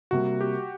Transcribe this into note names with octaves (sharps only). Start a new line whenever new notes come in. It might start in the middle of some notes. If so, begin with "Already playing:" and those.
C3 G3 A#3 F#4
G4